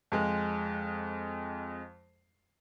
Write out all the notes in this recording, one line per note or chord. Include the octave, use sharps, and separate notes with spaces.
F2 G#3